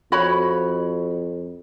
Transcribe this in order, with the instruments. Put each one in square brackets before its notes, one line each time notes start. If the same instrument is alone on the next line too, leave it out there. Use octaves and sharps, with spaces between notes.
[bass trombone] F2 [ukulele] F#4 C#5 B5